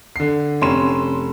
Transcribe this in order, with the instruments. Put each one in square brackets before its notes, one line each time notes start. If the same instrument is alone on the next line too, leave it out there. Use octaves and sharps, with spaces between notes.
[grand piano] D3 C7
[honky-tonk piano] F1 C6 E7 [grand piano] C#4